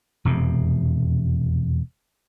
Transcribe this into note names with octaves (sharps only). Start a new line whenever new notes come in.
E1 F2 C3